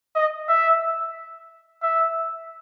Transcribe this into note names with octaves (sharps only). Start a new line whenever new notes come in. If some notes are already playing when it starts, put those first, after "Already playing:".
D#5
E5
E5